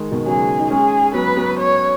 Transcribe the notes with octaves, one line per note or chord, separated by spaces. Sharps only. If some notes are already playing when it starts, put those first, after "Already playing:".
Already playing: D#3 G#3
B2 D#3
C#3 F#3 G#4
D#4
G#3 C#4 G#4
F#3 B3 B4
F#3 B3
C#5